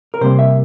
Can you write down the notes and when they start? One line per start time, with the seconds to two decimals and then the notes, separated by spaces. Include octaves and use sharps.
0.14 A#4
0.21 C3 G3 A#3 C5
0.39 E5